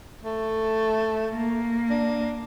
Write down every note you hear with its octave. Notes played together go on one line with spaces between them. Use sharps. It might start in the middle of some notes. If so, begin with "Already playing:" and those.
A3
A#3
D4